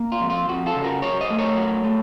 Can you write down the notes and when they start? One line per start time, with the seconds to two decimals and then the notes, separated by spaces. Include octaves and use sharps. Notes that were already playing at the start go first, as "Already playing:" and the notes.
Already playing: A#3
0.12 F4
0.21 F2
0.30 F4
0.48 F2 F#4
0.66 F4 A4
0.76 C#3
0.84 F#4 A#4
1.02 F#3 A#4 C#5
1.21 C5 D#5
1.30 A3
1.38 A#4 C#5
1.57 F#3
1.84 A3